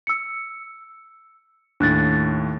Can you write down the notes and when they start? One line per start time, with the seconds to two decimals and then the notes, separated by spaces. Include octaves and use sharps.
0.07 E6 C#7
1.80 D#2 A2 D4 F#6 A6